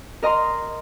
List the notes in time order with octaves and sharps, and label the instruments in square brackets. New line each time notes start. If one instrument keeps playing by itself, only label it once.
[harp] A#4 D#5 A#5 C6